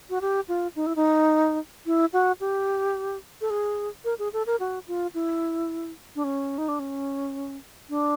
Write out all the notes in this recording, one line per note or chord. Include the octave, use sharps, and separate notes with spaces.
F#4
G4
F4
D#4
E4
D#4
E4
F#4
G4
A4
G#4
A#4
G#4
A4
A#4
F#4
F4
E4
D4
C#4
D#4
D4
C#4
D4